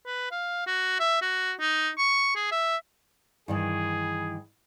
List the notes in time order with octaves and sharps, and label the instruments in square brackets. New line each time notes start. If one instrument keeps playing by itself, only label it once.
[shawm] B4
F5
F#4
E5
F#4
D#4
C#6
G#4
E5
[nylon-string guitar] G2 D#3 E3 [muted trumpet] G#4